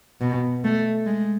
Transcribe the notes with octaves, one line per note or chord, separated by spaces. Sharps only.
B2
A3
G#3